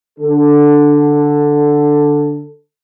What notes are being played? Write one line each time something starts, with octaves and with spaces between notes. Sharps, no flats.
D3 A4